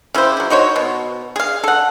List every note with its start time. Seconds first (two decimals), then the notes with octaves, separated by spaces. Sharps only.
0.14 C#3 E4 G4 C5
0.37 F#3 E4
0.50 D#4 F#4 C5 C#5
0.76 B2
1.36 G#4 F5
1.64 A4 F#5